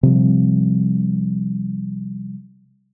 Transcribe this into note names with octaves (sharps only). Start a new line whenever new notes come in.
C3 F3 G3